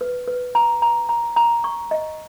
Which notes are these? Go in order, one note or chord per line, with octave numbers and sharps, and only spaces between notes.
B4
B4
A#5
A#5
A#5
A#5
C#6
D#5